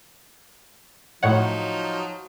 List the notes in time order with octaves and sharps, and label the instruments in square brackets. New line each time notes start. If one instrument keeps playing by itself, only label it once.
[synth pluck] A2 C#5 F#5 [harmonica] F3 F#3 D#4